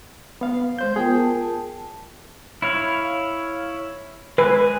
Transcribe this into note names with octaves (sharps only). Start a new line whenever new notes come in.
B3 F5
G#3 C5 G6
B3 F4 G#4 A#4 G5
A5
E4 C#5 F5
G#3 B4 G#5